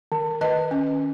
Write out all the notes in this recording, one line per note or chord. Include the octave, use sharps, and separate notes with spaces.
D#3
D#3 B4 D#5
C#4